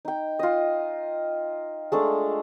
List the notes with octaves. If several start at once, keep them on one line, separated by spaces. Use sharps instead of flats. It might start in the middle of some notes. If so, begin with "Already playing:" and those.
D#4 G5
F4 D#5
G#3 A3 D4